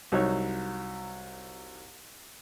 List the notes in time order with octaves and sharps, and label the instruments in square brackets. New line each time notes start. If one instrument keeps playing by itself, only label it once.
[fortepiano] C2 F#3 D#4 C#5